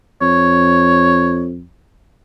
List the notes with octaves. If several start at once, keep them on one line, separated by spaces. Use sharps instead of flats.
F2 C#5